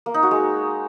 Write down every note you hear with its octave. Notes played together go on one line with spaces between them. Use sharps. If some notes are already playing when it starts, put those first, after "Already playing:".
A#3
D#4
F#4
G#3